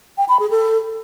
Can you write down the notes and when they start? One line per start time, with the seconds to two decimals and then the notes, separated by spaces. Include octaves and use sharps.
0.18 G5
0.29 B5
0.39 G#4
0.50 A4